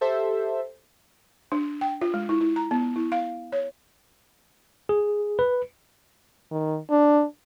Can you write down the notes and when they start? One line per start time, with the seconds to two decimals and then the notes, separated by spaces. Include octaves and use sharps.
0.01 G4 A4 C5 E5
1.52 D4
1.81 G5
2.01 F4
2.14 G#3
2.29 E4
2.41 E4
2.56 A#5
2.71 B3
2.96 E4
3.12 F5
3.52 C#5
4.89 G#4
5.39 B4
6.51 D#3
6.90 D4